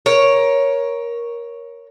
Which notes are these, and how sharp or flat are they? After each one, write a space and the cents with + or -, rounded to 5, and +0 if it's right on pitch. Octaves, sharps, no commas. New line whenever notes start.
A#4 +15 C#5 +0